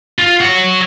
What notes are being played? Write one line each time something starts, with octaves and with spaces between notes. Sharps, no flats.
F4
F#4 C#5